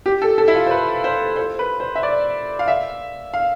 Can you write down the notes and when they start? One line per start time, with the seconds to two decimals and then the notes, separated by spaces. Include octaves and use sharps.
0.06 G4
0.22 A4
0.38 A4
0.48 E4
0.55 F4
0.66 C5
0.71 B4
1.04 C5
1.36 C5
1.59 B4
1.80 C5
1.95 E5
2.03 D5
2.59 F5
2.68 E5
3.34 F5